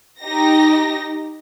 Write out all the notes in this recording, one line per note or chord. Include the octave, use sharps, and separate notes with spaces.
D#4 G4 A#6